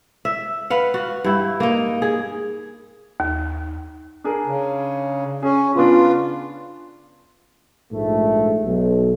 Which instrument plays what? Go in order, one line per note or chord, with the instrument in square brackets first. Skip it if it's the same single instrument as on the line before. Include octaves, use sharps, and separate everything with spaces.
[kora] E5
B4 F5 F#5
F#4
G2 E4
A#3 D#4
G#4
[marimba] D#2
[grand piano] D4 G#4 A#4
[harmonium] C#3
[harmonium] C#4 [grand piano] G#4
[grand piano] C#3 B3 D4 [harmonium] F4
[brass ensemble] A#1 G#2 A3
B1